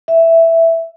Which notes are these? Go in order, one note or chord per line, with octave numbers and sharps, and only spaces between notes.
E5